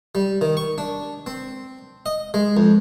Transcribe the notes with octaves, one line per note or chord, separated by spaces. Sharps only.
G3
D#3
C#6
D4
C4
D#5
G#3
F2